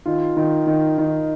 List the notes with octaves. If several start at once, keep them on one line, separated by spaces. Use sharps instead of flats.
D#3 F4
D#3
D#3
D#3